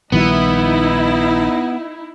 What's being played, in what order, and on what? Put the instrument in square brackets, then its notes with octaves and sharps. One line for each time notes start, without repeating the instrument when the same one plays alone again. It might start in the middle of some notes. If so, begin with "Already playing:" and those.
[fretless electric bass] A#1 D#3 G3 [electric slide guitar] B3 [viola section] D#4 E4